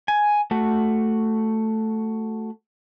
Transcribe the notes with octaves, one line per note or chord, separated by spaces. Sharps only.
G#5
A3 F#4